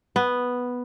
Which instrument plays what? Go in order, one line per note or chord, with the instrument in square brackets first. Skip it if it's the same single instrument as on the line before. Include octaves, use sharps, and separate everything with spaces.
[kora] B3